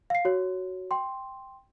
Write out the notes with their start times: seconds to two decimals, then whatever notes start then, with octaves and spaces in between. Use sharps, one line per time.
0.10 F5 C7
0.25 F#4 C#5
0.91 G5 C6